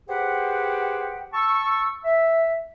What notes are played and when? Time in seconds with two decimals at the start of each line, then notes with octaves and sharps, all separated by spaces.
0.08 G4 G#4 B4 C5 F#5 G5
1.33 A5 C#6 E6
2.05 E5